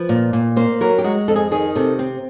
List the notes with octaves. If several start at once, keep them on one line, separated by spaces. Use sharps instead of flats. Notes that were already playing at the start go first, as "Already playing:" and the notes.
Already playing: F3 B4
A#2
A#2
A#3 C5
F#3 A#4
G4
G#3 F#4
F2 A4
G#4
D#3 G#4
C3 A4
C4